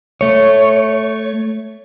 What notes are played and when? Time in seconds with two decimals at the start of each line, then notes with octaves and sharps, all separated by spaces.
0.21 A3 C#5